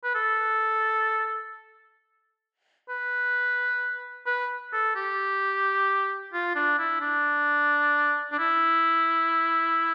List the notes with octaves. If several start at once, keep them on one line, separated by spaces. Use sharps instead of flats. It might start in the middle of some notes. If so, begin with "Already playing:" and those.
B4
A4
B4
B4
A4
G4
F4
D4
E4
D4
D4
E4